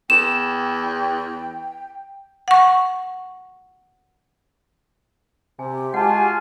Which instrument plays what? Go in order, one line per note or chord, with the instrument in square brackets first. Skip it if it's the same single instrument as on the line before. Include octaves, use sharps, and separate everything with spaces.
[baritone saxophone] E2 [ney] G5 [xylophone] E7
[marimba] F#5 C#6
[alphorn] C3 [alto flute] G4 [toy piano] G#5
[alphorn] G#3 [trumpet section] F4 F#4 G#5 [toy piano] F#5 A5